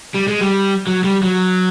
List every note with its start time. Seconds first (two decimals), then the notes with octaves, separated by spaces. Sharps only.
0.14 G3
0.28 G#3
0.41 G3
0.87 F#3
1.04 G3
1.23 F#3